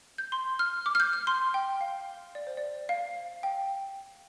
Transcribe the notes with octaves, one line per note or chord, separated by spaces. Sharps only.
G6
C6
F6
D6
F6
G6
F6
C6
G5
F5
D5
C5
D5
F5
G5